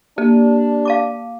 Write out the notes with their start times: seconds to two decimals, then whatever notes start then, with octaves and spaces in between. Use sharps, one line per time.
0.18 A#3 D4 G4
0.85 F5 A5 D6